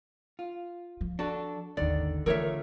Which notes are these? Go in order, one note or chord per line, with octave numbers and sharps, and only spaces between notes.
F4
F3
D4 F#4 A4
G#1 D#2 D3 D#3 D5
D3 E3 F3 A3 A#4 C#5 E5